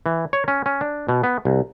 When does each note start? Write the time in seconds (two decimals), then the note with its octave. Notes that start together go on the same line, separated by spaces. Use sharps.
0.06 E3
0.33 C#5
0.48 C#4
0.66 C#4
0.81 D4
1.09 B2
1.23 B3
1.45 C2